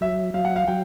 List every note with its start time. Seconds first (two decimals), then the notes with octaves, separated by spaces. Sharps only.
0.01 F#3 E5
0.34 F#3 F5
0.45 F#5
0.56 F5
0.68 F#3 G5